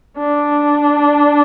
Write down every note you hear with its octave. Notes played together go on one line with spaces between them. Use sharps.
D4